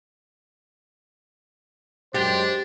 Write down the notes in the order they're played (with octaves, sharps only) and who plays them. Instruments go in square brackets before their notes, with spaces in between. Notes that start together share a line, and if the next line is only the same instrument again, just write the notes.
[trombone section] F#2 G#3 C5 [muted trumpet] D4 [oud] G4